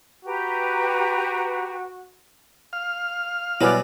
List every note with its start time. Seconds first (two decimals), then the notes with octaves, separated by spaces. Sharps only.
0.25 F#4 G4 B4 A#5
2.73 F5 F6
3.61 B2 F#3 G3 E4 B4 D5 G#5